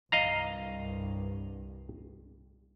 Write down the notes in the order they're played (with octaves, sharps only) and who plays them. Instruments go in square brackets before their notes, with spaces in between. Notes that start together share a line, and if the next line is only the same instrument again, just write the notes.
[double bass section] C2 G2 [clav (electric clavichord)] D#5 F5 A#5